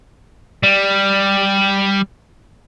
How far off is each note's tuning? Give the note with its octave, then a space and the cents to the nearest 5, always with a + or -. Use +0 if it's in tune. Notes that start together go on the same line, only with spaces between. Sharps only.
G3 +5